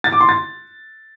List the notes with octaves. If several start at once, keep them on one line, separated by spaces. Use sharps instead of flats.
A6
D6
C6
A6